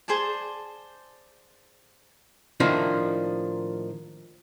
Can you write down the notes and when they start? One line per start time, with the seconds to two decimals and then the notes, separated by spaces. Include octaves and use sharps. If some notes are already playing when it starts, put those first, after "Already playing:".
0.08 G#4 C5 D5 A5
2.60 A2 D#3 F3 A#3 D4 D#4